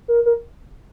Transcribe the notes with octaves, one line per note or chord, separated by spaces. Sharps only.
A#4
A#4